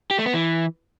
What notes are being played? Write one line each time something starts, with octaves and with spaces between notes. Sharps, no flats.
G4
A3
B3
E3